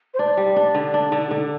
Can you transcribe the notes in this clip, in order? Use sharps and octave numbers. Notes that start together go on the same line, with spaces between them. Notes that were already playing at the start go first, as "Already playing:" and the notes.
C5
D4 D5
G3
D4
D3
D4
D3
D3